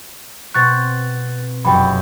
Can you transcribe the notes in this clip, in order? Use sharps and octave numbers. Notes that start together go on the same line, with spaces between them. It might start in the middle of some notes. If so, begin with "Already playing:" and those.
B2 C4 C#6 F#6 A6
F1 F#2 G5 B5